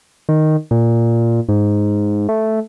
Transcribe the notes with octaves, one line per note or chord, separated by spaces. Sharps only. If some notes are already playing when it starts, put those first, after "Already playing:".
D#3
A#2
G#2
A3